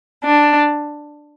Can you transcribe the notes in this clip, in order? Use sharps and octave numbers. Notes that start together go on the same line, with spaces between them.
D4